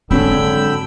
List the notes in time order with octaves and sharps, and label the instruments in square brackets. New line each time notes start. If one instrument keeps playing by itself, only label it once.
[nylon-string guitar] G#2 F#3 [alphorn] D3 [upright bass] C4 D4 [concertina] G5 B5 E6